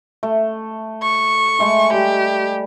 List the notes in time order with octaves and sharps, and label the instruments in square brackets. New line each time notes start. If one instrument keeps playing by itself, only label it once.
[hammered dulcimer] A3
[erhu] C#6
[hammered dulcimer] G#3 A3 D6
[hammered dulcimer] G3 [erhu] G4